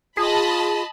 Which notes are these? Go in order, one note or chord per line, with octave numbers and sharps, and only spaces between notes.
F4 G#4 D#5 A5 B5